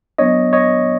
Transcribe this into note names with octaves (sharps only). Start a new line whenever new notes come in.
F#3 B3 D4 C#5 D#5
C#5 D#5